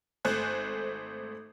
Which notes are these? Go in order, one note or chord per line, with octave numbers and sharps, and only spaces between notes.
G#1 A3 C5 G#5 F#6